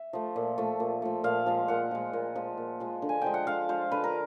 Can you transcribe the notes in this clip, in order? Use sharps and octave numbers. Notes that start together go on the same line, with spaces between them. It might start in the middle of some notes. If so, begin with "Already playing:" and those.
Already playing: E5
F3 A3
A#2
F3 A3
A#2
F3 A3
A#2 F5
F3 G#3
A#2 F#5
F3 G#3
A#2
F3 G#3
A#2
F3 G#3
D3
G#5
F3 G#3 G5
F#5
D3 F5
F3 G#3 C5
D3 B4
A#4